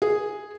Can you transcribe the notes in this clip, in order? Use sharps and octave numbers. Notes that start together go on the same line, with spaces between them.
G#4